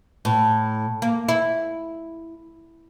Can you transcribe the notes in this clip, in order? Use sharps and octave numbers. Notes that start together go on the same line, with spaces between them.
A2
A#3
E4